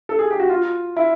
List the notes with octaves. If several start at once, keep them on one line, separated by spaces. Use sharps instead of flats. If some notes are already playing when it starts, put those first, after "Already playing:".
A4
G#4
G4
F#4
F4
E4